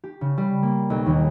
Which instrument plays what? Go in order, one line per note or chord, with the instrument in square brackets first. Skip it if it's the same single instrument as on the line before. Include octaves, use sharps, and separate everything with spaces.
[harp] G4
C#3
G3
A#3
B1
D#2